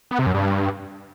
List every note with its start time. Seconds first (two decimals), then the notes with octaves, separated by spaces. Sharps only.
0.11 B3
0.19 C3
0.27 F#2
0.34 G2